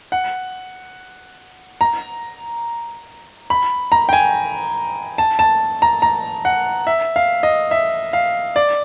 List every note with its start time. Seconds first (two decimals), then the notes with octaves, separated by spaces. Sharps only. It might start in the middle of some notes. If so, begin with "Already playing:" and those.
0.12 F#5
1.81 A#5
3.50 B5
3.92 A#5
4.09 G5
4.13 G#5
5.18 A5
5.39 A5
5.82 A#5
6.02 A#5
6.45 F#5
6.87 E5
7.16 F5
7.43 D#5
7.71 E5
8.13 F5
8.56 D5